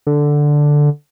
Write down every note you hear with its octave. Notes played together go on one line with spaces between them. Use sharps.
D3